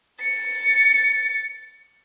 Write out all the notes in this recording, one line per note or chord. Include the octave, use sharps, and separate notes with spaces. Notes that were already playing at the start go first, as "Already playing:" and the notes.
A6 C#7